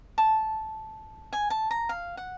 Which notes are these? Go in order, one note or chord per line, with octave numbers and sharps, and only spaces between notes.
A5
G#5
A5
A#5
F5
F#5